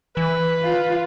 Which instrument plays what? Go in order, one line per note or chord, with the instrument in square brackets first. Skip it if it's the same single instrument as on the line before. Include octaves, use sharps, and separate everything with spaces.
[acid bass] E3 [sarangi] B4
[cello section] F4